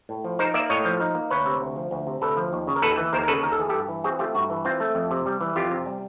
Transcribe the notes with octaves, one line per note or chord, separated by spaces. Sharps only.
A2
F3
D#4 A#4 C5
A#3 D5 E5
A2 C#5 D#5
F3
D#4
A#3
D2 B4 C#5
C3
D2
F3
D2
C3
D2 A4 B4
F3
D#2
C#3
A#4
D#2 A4 B4
E3
D#2 A#4 C5
A#4
C#3 A4 B4
D#2 A#4
A4
E3 G#4
G2 G4 A4
E3
C4 F#4 G#4
A3 F4 G4
G2 F#4
E3
C4 F4
A3
F2
C3
G3
E3
F2 F4 G4
C3
G3